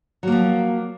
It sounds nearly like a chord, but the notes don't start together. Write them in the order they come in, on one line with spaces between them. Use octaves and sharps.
F#3 A#3 F3